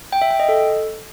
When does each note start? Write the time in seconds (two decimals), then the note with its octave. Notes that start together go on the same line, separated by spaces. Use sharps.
0.13 G5
0.22 E5
0.31 G5
0.40 D#5
0.49 A4